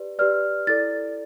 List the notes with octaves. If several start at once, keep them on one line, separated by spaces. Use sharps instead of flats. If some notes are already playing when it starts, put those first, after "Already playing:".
Already playing: G4 B4 D5
G4 B4 D5 F6
E4 A4 D5 A6